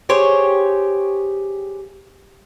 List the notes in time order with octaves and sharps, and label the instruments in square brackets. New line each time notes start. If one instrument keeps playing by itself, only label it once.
[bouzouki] G4 G#4 C5 C#5